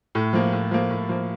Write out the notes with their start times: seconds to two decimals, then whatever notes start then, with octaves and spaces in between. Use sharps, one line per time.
0.15 A2
0.33 F3 A#3
0.52 A2
0.71 F3 A#3
0.90 A2
1.09 F3 A#3